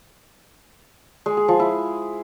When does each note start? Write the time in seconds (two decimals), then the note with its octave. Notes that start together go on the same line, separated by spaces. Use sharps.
1.26 G#3
1.37 G#4
1.48 F3
1.60 E4